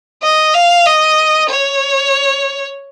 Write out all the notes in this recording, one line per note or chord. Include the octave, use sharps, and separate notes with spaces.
D#5
F5
D#5
C#5